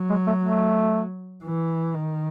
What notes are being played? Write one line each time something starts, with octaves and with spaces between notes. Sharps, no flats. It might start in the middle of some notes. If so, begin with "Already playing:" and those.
Already playing: F#3
G#3
A3
A3
E3
D#3